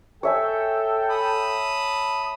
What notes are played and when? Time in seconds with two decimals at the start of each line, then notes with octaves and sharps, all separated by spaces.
0.23 A4 C#5 E5 G5 G#5
1.10 A5 B5 D#6